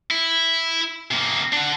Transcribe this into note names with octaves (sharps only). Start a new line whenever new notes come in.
E4
C3 A#3
D4 F#5